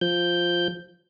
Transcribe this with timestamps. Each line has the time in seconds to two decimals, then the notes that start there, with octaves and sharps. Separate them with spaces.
0.01 F3 G6